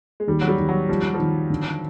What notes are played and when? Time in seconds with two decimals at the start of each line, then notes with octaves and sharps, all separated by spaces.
0.20 G#3
0.27 D#2 G3
0.41 F#3
0.48 G3
0.58 D#2
0.69 F#3
0.88 F3 G3
1.14 F3
1.19 D#3
1.50 D3